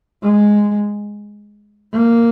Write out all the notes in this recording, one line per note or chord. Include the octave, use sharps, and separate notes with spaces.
G#3
A#3